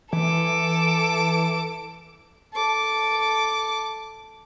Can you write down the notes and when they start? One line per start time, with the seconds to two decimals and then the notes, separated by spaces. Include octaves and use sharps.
0.13 E3 A4 D6
2.53 A4 D6